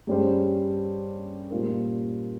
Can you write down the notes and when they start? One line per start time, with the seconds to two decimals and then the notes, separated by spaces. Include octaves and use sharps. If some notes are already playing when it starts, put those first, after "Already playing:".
0.07 G2 G3 C#4 G#4 C5
1.50 A#2 G3 A#3 F4 A#4